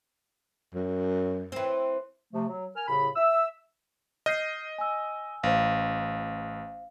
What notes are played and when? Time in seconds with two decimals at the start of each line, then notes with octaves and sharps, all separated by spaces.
0.75 F#2
1.52 E3 C4
2.33 C3 F3 A3
2.48 F#3
2.75 A#4 G#5 F6
2.87 C2 A2 C#3 B5
3.16 E5 E6
4.26 D#5 F6 G6 C7
4.78 G#5 E6
5.43 A1 C5 F5